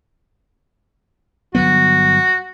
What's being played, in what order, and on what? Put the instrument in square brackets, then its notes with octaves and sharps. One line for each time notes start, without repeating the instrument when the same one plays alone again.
[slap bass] G1 F#3 B3 [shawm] F#4